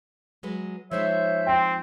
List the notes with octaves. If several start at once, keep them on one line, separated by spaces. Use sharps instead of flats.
F#3 G#3 B4
F3 G#3 D#4 C5 C#5 E5
C4 G5